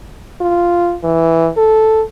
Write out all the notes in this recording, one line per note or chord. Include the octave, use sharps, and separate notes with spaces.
F4
E3
A4